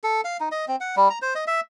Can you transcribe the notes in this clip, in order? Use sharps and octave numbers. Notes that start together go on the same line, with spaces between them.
A4
F5
D#4
D#5
C4
F#5
G3
A#5
C5
D#5
E5